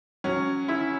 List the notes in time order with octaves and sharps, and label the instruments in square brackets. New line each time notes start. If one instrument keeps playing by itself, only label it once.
[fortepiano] F#3 [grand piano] C#4
[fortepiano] E4